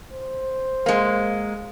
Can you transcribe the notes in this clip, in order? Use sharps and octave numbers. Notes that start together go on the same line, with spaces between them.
C5
G#3 A#3